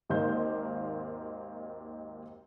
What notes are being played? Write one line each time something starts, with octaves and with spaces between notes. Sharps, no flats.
G#1 D#2 D#3 A#3 C5 G6